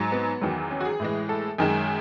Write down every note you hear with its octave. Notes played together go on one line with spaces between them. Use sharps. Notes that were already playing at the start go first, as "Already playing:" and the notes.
Already playing: G#2 F#3
B3
E2 D#3 F#3
C#4
F#4
G#4
A2 E3 G#3
A4
F#2 D#3 G#3